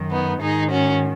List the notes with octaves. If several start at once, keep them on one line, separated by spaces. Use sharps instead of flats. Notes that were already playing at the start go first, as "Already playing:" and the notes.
Already playing: F#2 D#3
B3 D#4
G#2 D#3 D#4 G#4
C#4 F#4